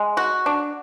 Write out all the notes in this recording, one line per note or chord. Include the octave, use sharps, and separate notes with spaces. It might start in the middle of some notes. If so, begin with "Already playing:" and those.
Already playing: G#3
F#4
D4